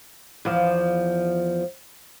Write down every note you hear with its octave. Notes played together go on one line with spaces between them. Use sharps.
E2 F3